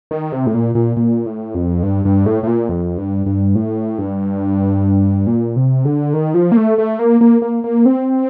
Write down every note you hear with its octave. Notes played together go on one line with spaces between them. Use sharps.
D#3
C3
A2
A#2
A#2
A#2
A2
F2
G2
G2
A2
A2
A#2
F2
G2
G2
A2
G2
A#2
C3
D3
D#3
F3
A#3
A3
A3
A#3
A#3
A#3
A#3
C4